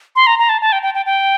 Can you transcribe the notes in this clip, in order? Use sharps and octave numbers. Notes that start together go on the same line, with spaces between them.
C6
A#5
A#5
A5
A5
G5
G5
G5
G5